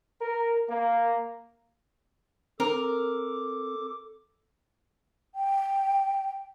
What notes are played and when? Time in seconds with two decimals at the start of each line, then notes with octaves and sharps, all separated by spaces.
0.22 A#4
0.70 A#3
2.60 C4 A4 A#4 D6
5.35 G5